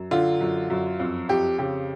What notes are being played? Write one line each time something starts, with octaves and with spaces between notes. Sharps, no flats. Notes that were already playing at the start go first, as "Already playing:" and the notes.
Already playing: F#2
D3 F4
F#2
F#2
F2
F2 G4
C#3 G4